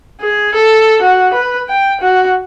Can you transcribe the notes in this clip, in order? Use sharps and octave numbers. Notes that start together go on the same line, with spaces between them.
G#4
A4
F#4
B4
G5
F#4